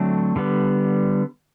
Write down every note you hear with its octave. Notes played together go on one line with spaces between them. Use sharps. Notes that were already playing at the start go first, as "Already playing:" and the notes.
Already playing: D3 F#3 A3 C4 D4
D3 G3 B3